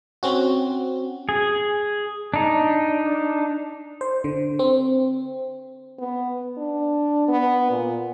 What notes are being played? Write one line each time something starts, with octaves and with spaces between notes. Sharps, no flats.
C4 C#4 F#4
G#4
D4 D#4
C5
D3
C4
B3
D4
B3
A#2